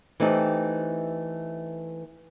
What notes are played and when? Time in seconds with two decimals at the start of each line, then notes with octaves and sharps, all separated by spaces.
0.20 E3 A3 C4 D#4 G4